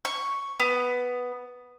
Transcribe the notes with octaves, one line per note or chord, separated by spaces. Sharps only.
C#6
B3